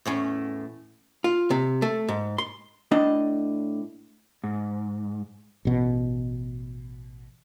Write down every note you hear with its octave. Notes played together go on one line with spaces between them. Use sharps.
E2 A2 C#4
F4
C3
A3
G#2
C6
A2 D4 D#5
G#2
A1 B2